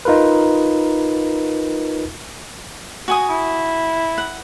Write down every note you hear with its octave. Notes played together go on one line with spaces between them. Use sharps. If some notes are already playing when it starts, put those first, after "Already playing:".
D#4 F4 A#4 B4
F#4 G#5 D#6
E4
F#5